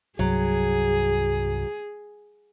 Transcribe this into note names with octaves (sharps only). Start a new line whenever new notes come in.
C2 G2 F#3 G#4